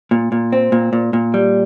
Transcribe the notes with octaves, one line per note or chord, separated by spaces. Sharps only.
A#2
A#2
C4
A#2
A#2
A#2
G3